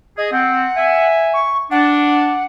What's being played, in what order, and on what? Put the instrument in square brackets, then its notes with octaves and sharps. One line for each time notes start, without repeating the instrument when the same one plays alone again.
[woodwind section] G#4 [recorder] D#5
[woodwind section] C4 [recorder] F#5
[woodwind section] E5 G#5
[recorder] C#6
[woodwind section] D4 [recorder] F#5